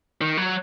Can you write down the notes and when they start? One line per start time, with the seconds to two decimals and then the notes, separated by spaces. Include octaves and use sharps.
0.21 D#3
0.37 F#3